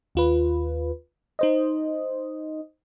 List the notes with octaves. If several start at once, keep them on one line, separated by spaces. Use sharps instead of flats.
D#2 F4 B4
D#4 C5 D#5